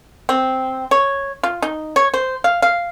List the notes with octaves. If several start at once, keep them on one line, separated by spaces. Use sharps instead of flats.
C4
C#5
F4
D#4
C#5
C5
F5
F5